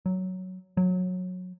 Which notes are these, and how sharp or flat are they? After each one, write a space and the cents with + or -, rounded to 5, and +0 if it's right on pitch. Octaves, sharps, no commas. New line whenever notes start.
F#3 +5
F#3 -20